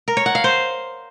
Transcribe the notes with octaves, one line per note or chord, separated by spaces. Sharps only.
A#4
C#5
F#5
F5
C5